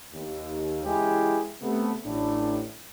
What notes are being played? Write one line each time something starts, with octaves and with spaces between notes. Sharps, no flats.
D#2
C#3 E3 G#3 E4 G4 G#4
C3 A3 B3
A1 A2 D4